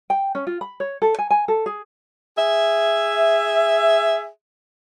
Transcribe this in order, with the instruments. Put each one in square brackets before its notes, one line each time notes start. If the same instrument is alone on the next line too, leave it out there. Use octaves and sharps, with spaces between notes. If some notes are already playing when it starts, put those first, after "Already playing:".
[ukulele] G5
C#4
F4
B5
C#5
A4
G#5
G#5
A4
G#4
[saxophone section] G#4 E5